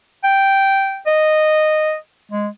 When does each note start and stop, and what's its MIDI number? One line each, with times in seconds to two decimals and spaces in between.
0.24 1.00 79
1.07 1.95 75
2.32 2.48 56